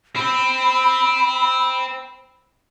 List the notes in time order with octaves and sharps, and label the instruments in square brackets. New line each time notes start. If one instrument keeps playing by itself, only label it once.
[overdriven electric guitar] C4 [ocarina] B5